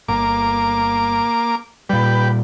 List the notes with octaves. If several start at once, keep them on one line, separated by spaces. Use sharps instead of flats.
G1 A#3 D6
A#2 G3 G4 B4